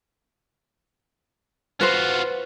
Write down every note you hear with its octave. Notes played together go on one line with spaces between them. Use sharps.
F4 F#4 B4 C5